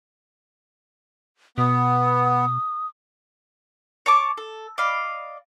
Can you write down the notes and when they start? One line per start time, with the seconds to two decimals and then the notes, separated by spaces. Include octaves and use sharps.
1.58 B2 B3 D#6
4.06 C#5 A5 D6
4.37 A4
4.78 D5 D#5 F5 B5